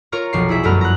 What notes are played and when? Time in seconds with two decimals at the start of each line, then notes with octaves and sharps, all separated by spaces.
0.12 F4 A#4 C#5 A#5 C#6 F6
0.33 F1 B1 F3 D4 C#6 C7
0.49 E4 G#4 E5
0.63 G1 F#2 A3 B3 A#5 F6
0.81 A#5 F#6